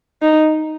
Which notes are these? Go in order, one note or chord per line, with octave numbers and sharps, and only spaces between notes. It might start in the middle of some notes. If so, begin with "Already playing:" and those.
D#4